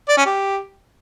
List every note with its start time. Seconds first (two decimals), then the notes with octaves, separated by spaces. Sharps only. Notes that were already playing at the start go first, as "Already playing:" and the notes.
0.09 D5
0.17 C#4
0.26 G4